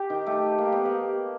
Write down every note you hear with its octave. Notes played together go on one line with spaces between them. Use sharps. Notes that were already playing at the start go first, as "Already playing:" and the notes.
Already playing: G4
D#3
A3
A#3
B3
A#3